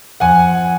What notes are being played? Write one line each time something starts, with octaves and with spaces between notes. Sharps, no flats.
F2 F#5 G#5